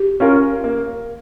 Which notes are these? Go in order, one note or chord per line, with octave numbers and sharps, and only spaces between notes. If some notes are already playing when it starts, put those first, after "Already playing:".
Already playing: G4
C#4 F4 A#4
A#3